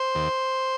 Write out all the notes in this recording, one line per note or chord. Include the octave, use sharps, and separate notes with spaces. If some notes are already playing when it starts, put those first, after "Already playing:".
Already playing: C5
D#2